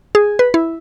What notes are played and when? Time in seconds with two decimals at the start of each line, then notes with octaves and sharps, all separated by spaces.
0.15 G#4
0.39 B4
0.54 E4